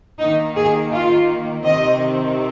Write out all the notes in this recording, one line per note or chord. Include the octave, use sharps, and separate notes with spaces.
D#3 A#3 D#4
G#4
F4
C3 D#3 C4 D#5